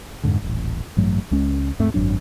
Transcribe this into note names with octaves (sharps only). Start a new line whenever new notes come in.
F2 G#2 D3
D#1 A1
A1 G2 F#3 A3
C#2 G#3 C#4
D#2 G#2 A3 C4
G#1 F#2 F#3 D4